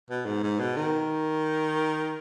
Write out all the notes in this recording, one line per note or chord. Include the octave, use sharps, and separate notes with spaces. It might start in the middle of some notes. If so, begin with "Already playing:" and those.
B2
G#2
G#2
B2
D#3